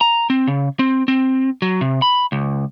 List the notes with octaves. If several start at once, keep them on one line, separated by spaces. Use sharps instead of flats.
A#5
C4
C#3
C4
C4
F#3
C3
B5
C#2